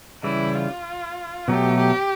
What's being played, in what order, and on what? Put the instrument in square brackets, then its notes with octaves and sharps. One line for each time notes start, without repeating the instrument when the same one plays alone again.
[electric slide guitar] C#3 E3 G3 [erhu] E4
[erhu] F4
[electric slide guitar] B2 F#3 A3 [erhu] G4
[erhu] G4